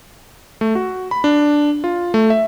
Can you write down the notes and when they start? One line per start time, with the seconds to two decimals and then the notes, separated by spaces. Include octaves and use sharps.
0.61 A3
0.75 F#4
1.11 B5
1.24 D4
1.84 F4
2.14 A3
2.30 E5